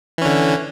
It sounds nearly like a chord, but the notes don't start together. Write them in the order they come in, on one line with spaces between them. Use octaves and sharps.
E3 C#4 D3